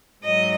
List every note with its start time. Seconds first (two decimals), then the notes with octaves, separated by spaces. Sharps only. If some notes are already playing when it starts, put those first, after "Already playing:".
0.23 G#2 F#3 D#5